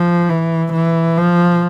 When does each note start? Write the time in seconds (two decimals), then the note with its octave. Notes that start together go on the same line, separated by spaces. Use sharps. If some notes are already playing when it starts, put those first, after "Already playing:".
Already playing: F3
0.29 E3
0.72 E3
1.17 F3